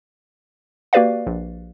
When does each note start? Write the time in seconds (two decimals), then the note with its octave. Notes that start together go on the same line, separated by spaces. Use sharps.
0.93 A#3 F#4 G4 B4 D5 F5
1.27 A#1